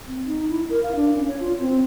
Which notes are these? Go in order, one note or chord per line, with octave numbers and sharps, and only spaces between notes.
C4
D#4
E4
A#4
F5
D4
C#4
C#5
F4
C4